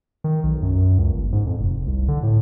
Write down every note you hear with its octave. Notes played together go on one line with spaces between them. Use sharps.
D#3
B1
F#2
C#2
G1
G#2
F2
F1
C2
D3
A2